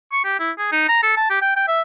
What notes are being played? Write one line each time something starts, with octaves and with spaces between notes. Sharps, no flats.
C#6
G4
E4
G#4
D#4
A#5
A4
A5
G4
G5
G5
E5